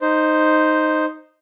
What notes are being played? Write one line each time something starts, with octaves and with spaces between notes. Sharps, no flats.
D#4 C5